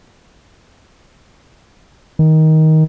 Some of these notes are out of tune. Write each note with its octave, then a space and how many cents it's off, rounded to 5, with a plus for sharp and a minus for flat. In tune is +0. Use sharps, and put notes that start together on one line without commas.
D#3 +15